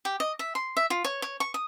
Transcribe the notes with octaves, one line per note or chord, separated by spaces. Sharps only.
G4
D#5
E5
C6
E5
F4
C#5
C#5
C#6
D#6